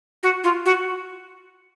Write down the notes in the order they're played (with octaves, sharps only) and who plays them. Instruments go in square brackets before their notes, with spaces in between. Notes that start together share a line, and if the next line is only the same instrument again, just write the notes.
[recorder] F#4
F4
F#4